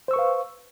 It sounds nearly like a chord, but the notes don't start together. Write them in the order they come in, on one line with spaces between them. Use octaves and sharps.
C5 E6 C#6 B4 F5